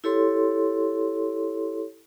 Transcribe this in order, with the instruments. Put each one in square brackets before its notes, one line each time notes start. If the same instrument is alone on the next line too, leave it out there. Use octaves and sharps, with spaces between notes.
[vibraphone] E4 G4 A4 C#5 C6